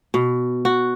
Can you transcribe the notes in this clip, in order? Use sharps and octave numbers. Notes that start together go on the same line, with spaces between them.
B2
F#4